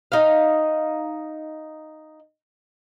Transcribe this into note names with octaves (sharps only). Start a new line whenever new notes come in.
D#4 F5